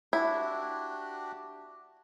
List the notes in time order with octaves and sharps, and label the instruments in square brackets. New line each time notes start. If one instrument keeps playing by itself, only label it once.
[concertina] D4 F#4 G4 [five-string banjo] E4